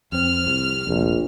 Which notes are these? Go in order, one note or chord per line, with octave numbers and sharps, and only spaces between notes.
F2 C4 F6
C2
F1 A#1